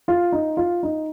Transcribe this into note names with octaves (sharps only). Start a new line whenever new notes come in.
F4
D#4
F4
D#4